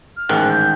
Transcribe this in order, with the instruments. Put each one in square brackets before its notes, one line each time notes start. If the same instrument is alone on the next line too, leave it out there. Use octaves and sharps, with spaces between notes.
[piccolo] F6
[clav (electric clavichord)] A1 G#2 D#3 [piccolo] F#6
[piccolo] G6